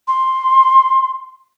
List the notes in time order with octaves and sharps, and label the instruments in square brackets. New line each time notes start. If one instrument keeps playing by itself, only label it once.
[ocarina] C6